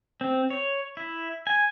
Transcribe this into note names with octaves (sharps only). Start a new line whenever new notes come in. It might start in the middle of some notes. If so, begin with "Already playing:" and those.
C4
C#5
E4
G#5